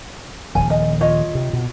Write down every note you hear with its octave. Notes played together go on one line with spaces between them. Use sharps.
D#1 F3 G#5
D#5
F4 C#5 D#5
C3
B2